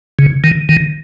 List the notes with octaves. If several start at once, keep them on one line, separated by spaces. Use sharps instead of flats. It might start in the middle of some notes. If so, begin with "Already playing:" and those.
C#3
D#3
D#3